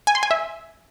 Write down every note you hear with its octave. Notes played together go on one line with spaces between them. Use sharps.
G#5
C6
G#5
E5